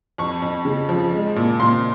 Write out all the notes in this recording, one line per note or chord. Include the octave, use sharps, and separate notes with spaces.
F2 C#6
F2
C#3
F3
G#3
A#2
A#2 C6